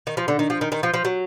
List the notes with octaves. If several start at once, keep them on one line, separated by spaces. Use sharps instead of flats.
D#3
F3
D3
D#3
F3
D#3
D#3
F3
F3
F#3